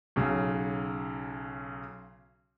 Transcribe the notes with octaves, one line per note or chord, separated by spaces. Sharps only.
B1 C#3 F#3